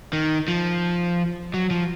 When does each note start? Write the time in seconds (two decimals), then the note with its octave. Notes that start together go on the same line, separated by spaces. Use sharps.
0.13 D#3
0.48 F3
1.54 F#3
1.71 F3